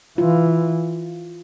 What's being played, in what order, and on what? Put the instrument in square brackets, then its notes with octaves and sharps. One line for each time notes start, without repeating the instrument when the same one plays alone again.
[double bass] E3 [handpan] F4